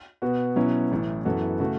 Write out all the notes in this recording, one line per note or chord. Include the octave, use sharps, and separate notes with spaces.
B2 B3 F#4
B2 F#3 C#4 E4
A1 A2 E3
F#2 E3 B3 F#4 A4
C#3 A3 F#4